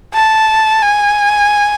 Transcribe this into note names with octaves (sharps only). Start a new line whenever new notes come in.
A5
G#5